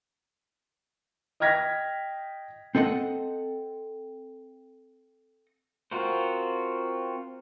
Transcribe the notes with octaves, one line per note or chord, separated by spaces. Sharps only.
D#5 G5 F6 G#6 A#6 B6
C4 A4 D#5 F#5
C4 F4 F#4 A#4 C5